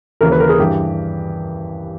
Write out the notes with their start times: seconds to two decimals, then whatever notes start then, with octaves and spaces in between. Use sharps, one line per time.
0.21 D#2 C#3 E3 A#4
0.32 B4
0.40 A#4
0.49 G#4
0.59 G2 E3 G4